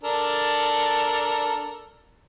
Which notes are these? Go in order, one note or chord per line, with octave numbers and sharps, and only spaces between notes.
D4 A4 A#4